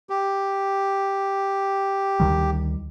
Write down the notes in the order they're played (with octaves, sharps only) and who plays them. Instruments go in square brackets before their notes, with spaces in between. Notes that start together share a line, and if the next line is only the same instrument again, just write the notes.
[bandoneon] G4
[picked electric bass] D2 D#3 G3